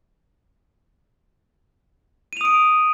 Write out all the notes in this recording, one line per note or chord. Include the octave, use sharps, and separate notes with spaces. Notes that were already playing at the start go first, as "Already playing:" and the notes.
D#6 D7 D#7 F7